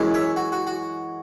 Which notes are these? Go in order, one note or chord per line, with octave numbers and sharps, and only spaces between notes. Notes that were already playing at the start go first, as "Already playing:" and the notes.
Already playing: F#2 E3 G#3 C#4 E4
C#5 E5
F#4
F#4
F#4